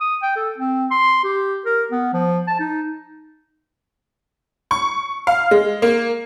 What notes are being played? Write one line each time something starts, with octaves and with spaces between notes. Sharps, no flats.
D#6
G5
A4
C4
C6
G4
A#4
B3
F3
A5
D#4
C#6
F5
G#3
A#3